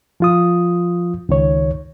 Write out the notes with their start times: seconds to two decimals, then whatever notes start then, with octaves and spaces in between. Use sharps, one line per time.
0.20 F3 F4 D#6
1.29 C#2 D#3 C#5